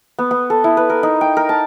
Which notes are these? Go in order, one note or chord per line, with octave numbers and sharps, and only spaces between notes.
B3
B3
A4
E4
B4
A#4
D#4
G5
A#4
A5